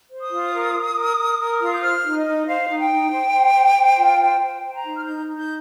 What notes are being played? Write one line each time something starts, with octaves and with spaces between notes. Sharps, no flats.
C5
D#6
F4
A#4
A#4
A#4
A#4
A#4
F4
G6
C5 F6
D#4
D#5
D#4
C5 F5
D#4
G5
D#4
C5
C5
C5
C5
F4
C5
C5 G5
C5
A#5
D#4
F6
D#4 G6
D#4
G6